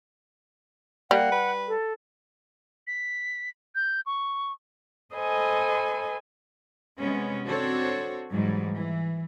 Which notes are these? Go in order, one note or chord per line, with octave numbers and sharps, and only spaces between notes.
G3 A#3 F#5
B4
A4
B6
G6
C#6
A4 C5 D#5 G#5 B5
C3 G#3 B3 C#4
C4 D4 F#4 A4 C5 C#5
G#2 E3 F#3 G3
E3